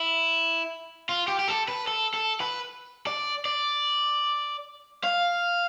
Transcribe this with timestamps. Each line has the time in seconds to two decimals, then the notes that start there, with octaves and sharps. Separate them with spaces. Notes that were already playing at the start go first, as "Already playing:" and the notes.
Already playing: E4
1.09 F4
1.28 G4
1.39 G4
1.48 A4
1.68 B4
1.87 A4
2.14 A4
2.41 B4
3.07 D5
3.45 D5
5.04 F5